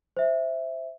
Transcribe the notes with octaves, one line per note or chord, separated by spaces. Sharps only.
C5 E5